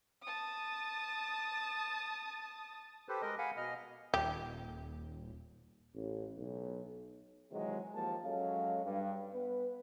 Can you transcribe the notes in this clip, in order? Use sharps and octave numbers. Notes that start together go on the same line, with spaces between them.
A5 D#6
G4 A4 B4 C5
G#3 A#4 D#5
F5 F#5 G#5 B5
B2 D#5 F6
D#1 G4
A1
B1
C3 D#3 E3 F#3 G#3
D#2 F3 G#3 A#3 G4 A5
F#3 G#3 C#4 A4 F5
G2
B3 B4